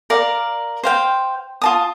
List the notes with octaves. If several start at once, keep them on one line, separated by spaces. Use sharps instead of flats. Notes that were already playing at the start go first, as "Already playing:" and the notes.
A#4 D5 F5
C5 F5 G5
F4 A5 D#6